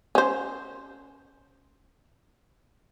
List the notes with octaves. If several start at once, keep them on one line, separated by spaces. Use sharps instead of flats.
C#4 C5